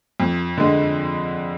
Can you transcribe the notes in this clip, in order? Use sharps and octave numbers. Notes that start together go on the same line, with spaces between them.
F2
D3 G#3